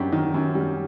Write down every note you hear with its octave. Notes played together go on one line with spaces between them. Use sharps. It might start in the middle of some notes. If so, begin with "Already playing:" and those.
Already playing: F#2 G3 D4 G4
D#3
F#2
G3